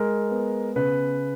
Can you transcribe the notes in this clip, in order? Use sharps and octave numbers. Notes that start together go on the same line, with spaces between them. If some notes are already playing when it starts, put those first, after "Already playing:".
Already playing: G#3 A#4
B3
C#3 B4